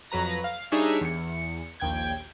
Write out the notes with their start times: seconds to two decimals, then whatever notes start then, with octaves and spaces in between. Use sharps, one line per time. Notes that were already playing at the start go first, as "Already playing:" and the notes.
0.11 F2 F#3 B4 A#5 A#6
0.44 F5
0.72 G3 D4 D#4 G#4 C#5 E5
1.01 E2 C#7
1.80 A#1 D#2 G5 G6 G#6